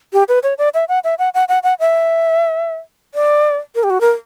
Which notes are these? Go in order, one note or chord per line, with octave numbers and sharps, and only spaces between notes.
G4
B4
C#5
D5
E5
F#5
E5
F#5
F#5
F#5
F#5
E5
D5
A#4
G4
F#4
A#4